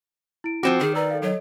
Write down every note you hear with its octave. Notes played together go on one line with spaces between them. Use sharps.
E4 D7
F3 C4 F#4 D6 D7 E7
D#3 G#4
B4 D5 A#5 E6
A4 F5
F#3 A4 C#5 D#5